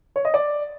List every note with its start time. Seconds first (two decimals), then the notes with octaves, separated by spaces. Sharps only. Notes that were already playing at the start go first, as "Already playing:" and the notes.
0.16 C#5
0.25 D#5
0.34 D5